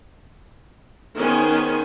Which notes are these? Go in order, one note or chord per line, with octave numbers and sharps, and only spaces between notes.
D#3 B3 C#4 G#4 C5 G#5